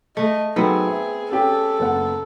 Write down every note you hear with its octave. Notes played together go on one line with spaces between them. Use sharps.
A3 D#5
F#3 B3 C4 D#4 G#4 A4
E5
C#4 G4 A4 G5
F#1 B3 F#5